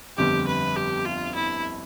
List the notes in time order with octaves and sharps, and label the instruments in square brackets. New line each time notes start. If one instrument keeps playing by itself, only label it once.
[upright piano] G1 F2 D3 G3 [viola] G4
[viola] B4
G4
F4
E4